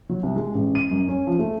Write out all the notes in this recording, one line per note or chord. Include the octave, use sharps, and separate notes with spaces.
F#3
C2
G#3
A1
D#7
F#2
C#4
F3
A3